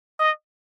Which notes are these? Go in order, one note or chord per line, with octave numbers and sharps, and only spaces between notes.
D#5